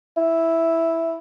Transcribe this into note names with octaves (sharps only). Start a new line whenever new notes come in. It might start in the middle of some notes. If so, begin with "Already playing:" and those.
E4